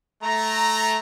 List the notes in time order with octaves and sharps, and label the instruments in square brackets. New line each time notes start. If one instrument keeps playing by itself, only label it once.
[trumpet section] A3 A#5